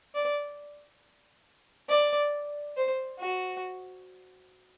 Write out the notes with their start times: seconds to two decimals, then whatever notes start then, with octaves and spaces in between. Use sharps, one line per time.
0.15 D5
1.89 D5
2.77 C5
3.20 F#4